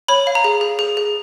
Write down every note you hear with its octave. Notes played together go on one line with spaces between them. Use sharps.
C#5 B5
F5
A#5
G#4
G#4
G#4
G#4